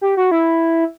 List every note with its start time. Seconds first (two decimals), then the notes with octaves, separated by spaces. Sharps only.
0.01 G4
0.17 F#4
0.31 E4